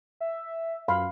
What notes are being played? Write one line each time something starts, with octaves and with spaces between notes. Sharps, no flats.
E5
F#2 F5 B5 C6